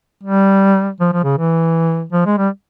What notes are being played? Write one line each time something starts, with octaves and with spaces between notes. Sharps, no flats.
G3
F3
F3
C#3
E3
F3
G#3
G3